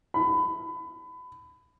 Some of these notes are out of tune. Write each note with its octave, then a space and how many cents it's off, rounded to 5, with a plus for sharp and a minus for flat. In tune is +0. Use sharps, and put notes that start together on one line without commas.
B5 +25